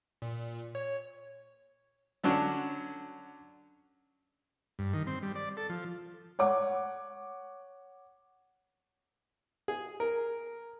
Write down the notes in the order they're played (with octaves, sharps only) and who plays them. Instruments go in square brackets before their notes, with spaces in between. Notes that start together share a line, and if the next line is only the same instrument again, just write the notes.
[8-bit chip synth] A#2
C#5
[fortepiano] D3 F#3 C#4 D4
[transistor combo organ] G2
D#3
C4
G3
D5
A4
F3
[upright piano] C#5 F#5 D6
[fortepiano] G#4
A#4